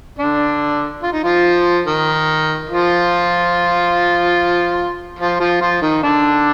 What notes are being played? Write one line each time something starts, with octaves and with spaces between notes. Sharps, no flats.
D3 D4
F4
D#4
F3 F4
D#3 D#4
F3 F4
F3 F4
F3 F4
F3 F4
D#3 D#4
D3 D4